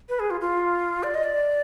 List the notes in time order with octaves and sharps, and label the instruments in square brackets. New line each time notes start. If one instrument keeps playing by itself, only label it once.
[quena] B4
G#4
F4
F4
D5
D#5
D5